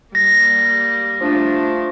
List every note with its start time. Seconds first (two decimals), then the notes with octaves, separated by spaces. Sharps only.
0.15 G3 A#3 A#6
1.20 F3 A3 D4